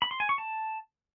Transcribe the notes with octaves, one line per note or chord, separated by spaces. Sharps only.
B5
C6
G#5
C#6
A5